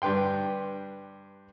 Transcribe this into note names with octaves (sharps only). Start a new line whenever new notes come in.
G2 G4 B4 G5 C6